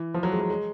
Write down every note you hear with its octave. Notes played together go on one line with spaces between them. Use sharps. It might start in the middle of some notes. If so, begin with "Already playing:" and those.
Already playing: E3
F3
F#3
G#3
F#3
G#3